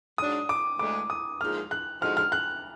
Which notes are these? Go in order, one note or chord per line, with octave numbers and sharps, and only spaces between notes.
G#2 F#3 D4 D#6
D6
D2 D3 G#3 D6
D#6
A#2 F3 G#3 D#4 F6
F#6
D3 F3 G#3 D#4 F#4 F6
F6
F#6